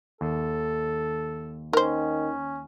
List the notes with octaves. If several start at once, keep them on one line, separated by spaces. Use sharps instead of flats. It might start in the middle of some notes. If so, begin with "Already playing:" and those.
D#2 A4
D#3 C#4 A#4 C5